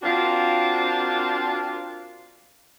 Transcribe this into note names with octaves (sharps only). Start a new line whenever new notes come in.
C4 D4 F4 F#4 A#4